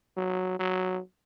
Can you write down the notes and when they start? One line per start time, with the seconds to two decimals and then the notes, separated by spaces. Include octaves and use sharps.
0.17 F#3
0.59 F#3